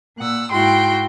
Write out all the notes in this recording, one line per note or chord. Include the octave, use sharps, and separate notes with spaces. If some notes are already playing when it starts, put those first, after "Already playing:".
A#2 F#5 E6
G#2 E4 F#4 G5 C6